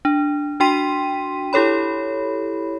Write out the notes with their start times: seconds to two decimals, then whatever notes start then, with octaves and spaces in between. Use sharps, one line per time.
0.05 D4
0.60 D4 F#4 G5 C6 B6 D#7
1.53 E4 G4 A4 C#5 B5